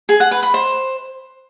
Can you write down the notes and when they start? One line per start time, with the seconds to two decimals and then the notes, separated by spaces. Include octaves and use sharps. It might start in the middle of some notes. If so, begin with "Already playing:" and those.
0.09 G#4
0.20 F#5
0.31 B4
0.43 B5
0.54 C5